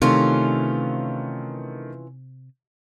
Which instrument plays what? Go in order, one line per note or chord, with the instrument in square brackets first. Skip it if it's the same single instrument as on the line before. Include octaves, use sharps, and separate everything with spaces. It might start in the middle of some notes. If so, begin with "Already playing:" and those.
[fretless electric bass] C3 [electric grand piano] D#3 A3 [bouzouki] E3 C#4 F4